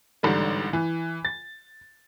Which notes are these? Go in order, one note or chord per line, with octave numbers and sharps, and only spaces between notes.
A1 G#2 D3 G3
E3
A6